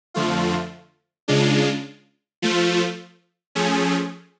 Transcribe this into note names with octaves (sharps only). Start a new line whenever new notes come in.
F2 D3 F3 A3 F4
C#3 G#3 D4 F4
F3 A3 F4
F3 A3 C#4 G#4